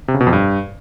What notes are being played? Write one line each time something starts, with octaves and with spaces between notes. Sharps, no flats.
C3
C#3
B2
F2
G2